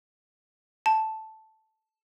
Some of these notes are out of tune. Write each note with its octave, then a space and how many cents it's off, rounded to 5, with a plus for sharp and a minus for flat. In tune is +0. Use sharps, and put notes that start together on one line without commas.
A5 -5